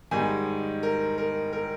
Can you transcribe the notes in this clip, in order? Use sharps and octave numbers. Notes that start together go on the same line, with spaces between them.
G#2 D#3 G3 G#5
A#4
A#4
A#4